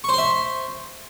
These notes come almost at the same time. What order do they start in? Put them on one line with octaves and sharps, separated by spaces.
C#6 C5 C6 E5